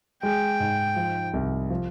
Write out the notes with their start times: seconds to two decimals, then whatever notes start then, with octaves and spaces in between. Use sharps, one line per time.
0.23 G#3 G5
0.60 G#2
0.96 F3
1.34 C2
1.70 F3